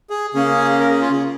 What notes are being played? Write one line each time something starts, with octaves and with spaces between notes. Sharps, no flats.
G#4
C#3 A#3 C#4 G#4
A#4
G#4
F4
G#4